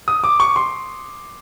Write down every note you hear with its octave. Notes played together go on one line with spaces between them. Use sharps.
D#6
D6
C#6
C6